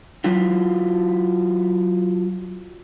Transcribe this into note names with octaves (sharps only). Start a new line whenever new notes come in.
F#3 E4 F4